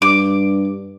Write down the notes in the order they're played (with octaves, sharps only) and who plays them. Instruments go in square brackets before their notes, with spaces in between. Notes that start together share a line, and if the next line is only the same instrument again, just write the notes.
[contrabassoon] G2 [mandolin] D6